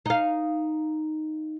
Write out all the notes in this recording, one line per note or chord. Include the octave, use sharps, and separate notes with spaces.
D#4 F5